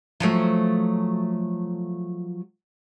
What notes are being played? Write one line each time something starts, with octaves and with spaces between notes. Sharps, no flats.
F3 F#3 A3